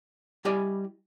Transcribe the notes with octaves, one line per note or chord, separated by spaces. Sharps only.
G3 E4 G4 D5 D#5 G#5